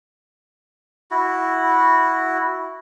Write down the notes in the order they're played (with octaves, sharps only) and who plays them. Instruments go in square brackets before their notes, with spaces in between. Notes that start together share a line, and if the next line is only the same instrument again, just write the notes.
[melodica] E4 F#4